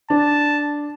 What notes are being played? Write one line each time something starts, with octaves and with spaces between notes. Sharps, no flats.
D4 A5